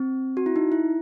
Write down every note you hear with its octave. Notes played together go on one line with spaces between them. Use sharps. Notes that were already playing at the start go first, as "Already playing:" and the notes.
Already playing: C4
F#4
E4
D#4
E4